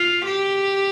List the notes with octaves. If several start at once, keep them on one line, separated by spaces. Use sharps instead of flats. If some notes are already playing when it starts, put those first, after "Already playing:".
Already playing: F4
G4